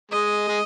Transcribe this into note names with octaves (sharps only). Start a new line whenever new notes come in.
G#3 D#5
G#3